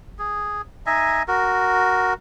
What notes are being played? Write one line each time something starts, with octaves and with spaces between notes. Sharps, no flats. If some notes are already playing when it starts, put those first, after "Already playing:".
G#4
D#4 D#5 E5 G#5
F#4 A#4